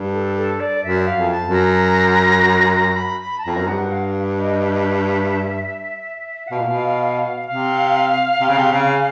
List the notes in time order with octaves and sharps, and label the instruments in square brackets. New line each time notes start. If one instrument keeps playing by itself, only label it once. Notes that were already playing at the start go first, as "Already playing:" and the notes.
Already playing: [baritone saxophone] G2
[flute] A4
A4
D5
[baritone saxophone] F#2 [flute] E5
[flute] F5
[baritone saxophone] F2
[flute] A5
[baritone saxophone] F#2
[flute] A#5
A#5
B5
B5
A5
[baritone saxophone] F2 [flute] A#5
[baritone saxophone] F#2
[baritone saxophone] G2 [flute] F#5
[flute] F5
D#5
E5
D#5
E5
F#5
[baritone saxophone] B2 [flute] F5
[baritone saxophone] A#2
B2
[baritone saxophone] C3 [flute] F5
[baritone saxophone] C3
C#3
C3
C#3